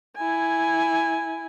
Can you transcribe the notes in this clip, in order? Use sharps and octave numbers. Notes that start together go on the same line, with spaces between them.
E4 G#5